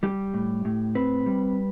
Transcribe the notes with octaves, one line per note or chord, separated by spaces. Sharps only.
G3 G4
A2
A2
C4 B4
G3